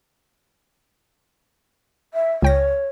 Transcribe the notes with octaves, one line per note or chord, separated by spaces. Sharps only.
E5
C#2 C#5 G5 A#6